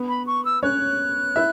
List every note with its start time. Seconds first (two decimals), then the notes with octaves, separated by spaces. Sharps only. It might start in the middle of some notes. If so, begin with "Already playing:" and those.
Already playing: B3 B4
0.09 B5
0.27 C#6
0.45 E6
0.63 C#4 C#5 F#6
1.36 E4 E5